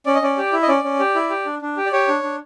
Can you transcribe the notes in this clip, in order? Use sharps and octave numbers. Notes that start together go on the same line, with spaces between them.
C#4 D5
D#5
C#4 D5
G4
E4
D#5
C#4 D5
C#4
G4
E4
G4
D4
D4
G4
D5
G4 C#5
D4
D4